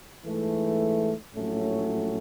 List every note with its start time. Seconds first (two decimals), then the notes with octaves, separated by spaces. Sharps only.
0.23 G#2 E3 A3
1.34 A#1 A2 F#3 A3 C#4